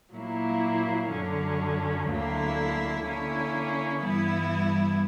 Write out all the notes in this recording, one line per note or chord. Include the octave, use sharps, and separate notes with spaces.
A#2 F#3 A#3 E4
F#2 D3 F#3 C#4
D2 D3 F#3 A#3 E4
D3 A#3 C#4 E4
G2 E3 G3 B3 E4